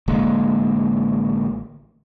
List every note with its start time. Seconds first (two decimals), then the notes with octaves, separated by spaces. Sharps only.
0.08 A1 D3 G#3 A#3